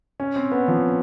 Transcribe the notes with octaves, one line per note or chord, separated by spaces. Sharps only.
C#4
C4
B3
F3